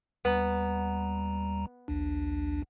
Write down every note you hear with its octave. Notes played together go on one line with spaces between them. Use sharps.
D#2 G3 B3 A#5
A#1 D#2 D4